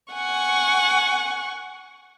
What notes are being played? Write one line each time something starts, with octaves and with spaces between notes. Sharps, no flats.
F#5 G#5 C#6